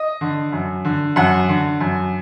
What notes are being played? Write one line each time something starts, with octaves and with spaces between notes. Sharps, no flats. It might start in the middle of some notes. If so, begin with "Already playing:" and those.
Already playing: D#5
D3
F#2
D3
F#2 F#5
D3
F#2